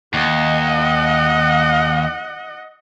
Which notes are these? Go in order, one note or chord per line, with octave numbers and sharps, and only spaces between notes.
D#2 D#5 F#5